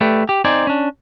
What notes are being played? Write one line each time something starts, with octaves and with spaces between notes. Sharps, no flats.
A3 G4 B4 D5
G4
C4 D#4 C5 D5 G#5
C#4 D4